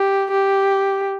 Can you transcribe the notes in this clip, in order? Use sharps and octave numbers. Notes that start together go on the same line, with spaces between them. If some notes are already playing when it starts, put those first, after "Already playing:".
Already playing: G4
G4